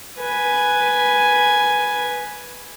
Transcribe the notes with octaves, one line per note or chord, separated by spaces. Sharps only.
B4 G#5